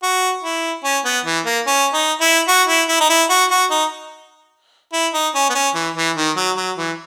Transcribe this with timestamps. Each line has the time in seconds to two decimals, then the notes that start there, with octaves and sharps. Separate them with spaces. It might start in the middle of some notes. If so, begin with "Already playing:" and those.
0.03 F#4
0.43 E4
0.84 C#4
1.05 B3
1.25 E3
1.45 A#3
1.66 C#4
1.93 D#4
2.21 E4
2.48 F#4
2.68 E4
2.89 E4
3.00 D#4
3.09 E4
3.30 F#4
3.50 F#4
3.71 D#4
4.93 E4
5.14 D#4
5.35 C#4
5.50 B3
5.55 C#4
5.75 E3
5.96 E3
6.16 D#3
6.36 F#3
6.57 F#3
6.77 E3